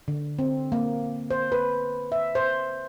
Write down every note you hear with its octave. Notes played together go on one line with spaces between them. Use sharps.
D3
C4
A#3
C5
B4
E5
C5